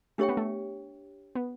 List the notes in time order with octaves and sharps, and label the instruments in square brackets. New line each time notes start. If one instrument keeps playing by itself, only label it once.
[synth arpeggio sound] A3 [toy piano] D4 G4 C#5 E5 G5
[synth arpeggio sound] B3
A3
B3